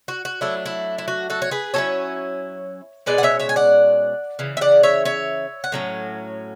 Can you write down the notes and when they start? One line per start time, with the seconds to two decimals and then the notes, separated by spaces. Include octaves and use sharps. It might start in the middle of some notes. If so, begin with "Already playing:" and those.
0.08 F#4
0.25 F#4
0.41 F#3 A3 D4 E4
0.66 E4
0.98 E4
1.08 F#4
1.30 F#4 A4
1.42 C#5
1.51 G#4 B4
1.74 F#3 C#4 E4 A4 C#5
3.06 B2 G#3 C#4 B4 D5
3.18 F#5
3.23 C#5 E5
3.40 C#5 E5
3.49 G#5
3.56 D5 F#5
4.39 C#3 E3
4.57 E5
4.61 D5 F#5
4.83 C#5 E5
5.05 C#5 E5
5.64 F#5
5.72 A2 F#3 C#4